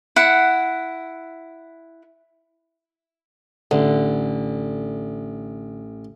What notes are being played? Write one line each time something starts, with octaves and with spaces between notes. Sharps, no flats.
E4 F#5
A1 D3